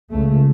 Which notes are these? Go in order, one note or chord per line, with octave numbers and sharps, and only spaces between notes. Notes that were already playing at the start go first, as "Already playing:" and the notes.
C#2 C#3 A3